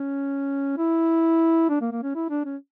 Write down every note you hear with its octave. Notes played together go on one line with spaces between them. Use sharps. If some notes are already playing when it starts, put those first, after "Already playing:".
Already playing: C#4
E4
D4
A#3
A#3
C#4
E4
D4
C#4